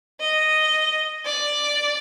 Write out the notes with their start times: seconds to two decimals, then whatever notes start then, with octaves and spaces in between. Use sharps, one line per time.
0.20 D#5
1.26 D5